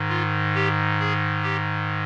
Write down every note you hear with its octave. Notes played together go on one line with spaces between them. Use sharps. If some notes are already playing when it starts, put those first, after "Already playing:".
Already playing: G#2 D#3
F4
G4
G#4
G4